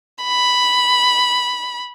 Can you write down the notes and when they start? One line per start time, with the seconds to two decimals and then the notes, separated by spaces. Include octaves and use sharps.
0.24 B5